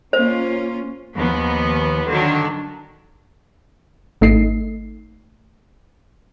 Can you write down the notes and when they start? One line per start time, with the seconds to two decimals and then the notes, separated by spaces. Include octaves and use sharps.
0.13 A#3 C#4 F4 C5
1.15 D#2 F3 B3
2.07 D3 D#3 F#3 D4
4.21 G#1 A3 D#4 C7